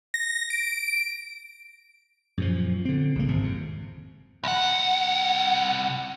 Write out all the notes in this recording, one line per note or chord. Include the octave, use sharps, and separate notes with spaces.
A#6
D7
F#2 A#2 F3
D3 C4
C2 C#3 A#3
G#1 G2 C3
F2
C2 F#5